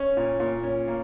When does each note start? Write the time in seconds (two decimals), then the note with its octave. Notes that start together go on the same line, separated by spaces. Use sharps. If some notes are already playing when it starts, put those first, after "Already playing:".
Already playing: C#4
0.17 A#2
0.40 A#2
0.63 C#4
0.88 A#3